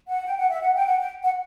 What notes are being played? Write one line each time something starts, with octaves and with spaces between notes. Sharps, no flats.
F#5
G5
F#5
E5
F#5
G5
F#5
G5
F#5